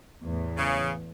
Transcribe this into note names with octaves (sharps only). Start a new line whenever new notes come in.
E2 A2
C#3